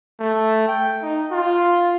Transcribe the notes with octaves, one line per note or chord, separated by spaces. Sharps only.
A3
G5
D#4
F4